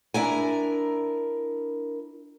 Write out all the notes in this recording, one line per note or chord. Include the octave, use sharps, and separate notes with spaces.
D4 E4 A#4 G#5